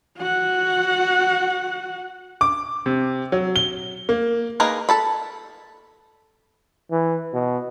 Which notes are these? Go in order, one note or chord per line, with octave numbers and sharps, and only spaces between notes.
F#4 F#5
D6
C3
F#3
G7
A#3
A#3 D#4 G#4 A#4 B4
A4 A5 B5
E3
B2